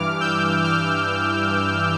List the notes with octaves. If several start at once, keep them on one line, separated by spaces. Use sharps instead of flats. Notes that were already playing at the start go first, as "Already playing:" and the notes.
Already playing: G2 E3 D6 F6
E6 G6
D6 F6